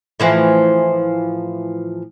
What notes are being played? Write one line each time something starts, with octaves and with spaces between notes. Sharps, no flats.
A2 E3 F3